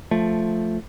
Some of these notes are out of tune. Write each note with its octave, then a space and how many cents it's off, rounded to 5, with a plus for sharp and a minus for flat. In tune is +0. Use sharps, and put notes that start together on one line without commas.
F3 +0 A3 +0